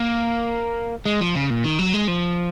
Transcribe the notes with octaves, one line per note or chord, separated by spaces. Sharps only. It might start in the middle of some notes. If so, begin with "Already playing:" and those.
Already playing: A#3
G#3
F3
C#3
A#2
D#3
F#3
G#3
F3